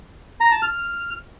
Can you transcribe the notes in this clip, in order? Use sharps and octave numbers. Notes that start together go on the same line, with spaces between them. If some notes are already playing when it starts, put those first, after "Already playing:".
A#5
A5
F6